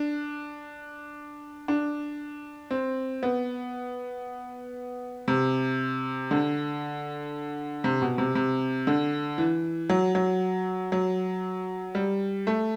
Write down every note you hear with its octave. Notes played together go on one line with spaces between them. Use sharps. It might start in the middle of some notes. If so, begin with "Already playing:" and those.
Already playing: D4
D4
C4
B3
C3
D3
C3
B2
C3
C3
D3
E3
F#3
F#3
F#3
G3
A3